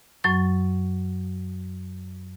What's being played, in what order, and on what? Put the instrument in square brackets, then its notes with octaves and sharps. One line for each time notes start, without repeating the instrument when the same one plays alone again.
[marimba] F#2 F#3 C#6